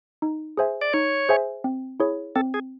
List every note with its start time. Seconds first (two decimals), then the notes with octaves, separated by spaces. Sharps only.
0.22 D#4
0.57 G#4 C5 E5 G#5
0.81 D5
0.93 D#4 C#5
1.29 G#4 C5 E5 G#5
1.64 C4
2.00 E4 G#4 C#5
2.36 C4 A4
2.54 G#4